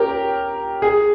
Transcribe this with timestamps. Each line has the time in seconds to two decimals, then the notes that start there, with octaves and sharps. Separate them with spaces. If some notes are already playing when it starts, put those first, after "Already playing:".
Already playing: C#4 G4 A#4
0.82 G#4